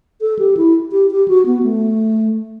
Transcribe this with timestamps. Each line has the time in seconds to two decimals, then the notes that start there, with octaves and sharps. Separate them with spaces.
0.21 A4
0.39 G4
0.57 E4
0.92 G4
1.11 G4
1.28 F#4
1.46 B3
1.63 A3